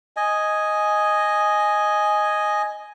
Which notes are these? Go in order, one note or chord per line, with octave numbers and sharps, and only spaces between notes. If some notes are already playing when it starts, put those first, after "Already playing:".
D#5 G#5